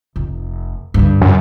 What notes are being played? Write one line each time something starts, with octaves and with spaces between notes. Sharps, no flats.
F1
G2 D3
F#2